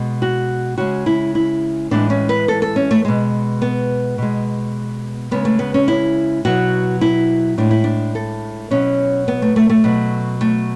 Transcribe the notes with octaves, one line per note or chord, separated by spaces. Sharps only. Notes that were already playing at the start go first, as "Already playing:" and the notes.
Already playing: B2 G#3
F#4
C#3 G#3 F#4
E4
E4
A2 E3 G#3 D4
C#4
B4
A4
A4
C#4
A3
B2 G#3
B3
B2 G#3
C#3 G#3 B3
A3
B3
C#4
E4
B2 F#3 F#4
E4
A2 G#3 D4
E4
D4
A4
B2 F#3 C#4
B3
A3
A3
A3
B2 F#3
A3